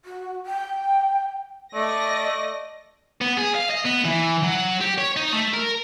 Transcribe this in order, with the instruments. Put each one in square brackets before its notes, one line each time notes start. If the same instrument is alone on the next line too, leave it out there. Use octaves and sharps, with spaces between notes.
[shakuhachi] F#4
G5
[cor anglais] A3 [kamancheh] D5 [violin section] D#5 A#6
[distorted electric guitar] B3
G#4
F5
D#5
B3
E3
F#3
G4
C#5
D#4
A3
A#4